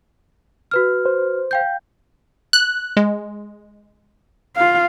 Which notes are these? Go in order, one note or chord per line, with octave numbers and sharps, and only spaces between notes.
F#4 B4 F6
C5
F5 G5 G6
F#6
G#3
F4 F5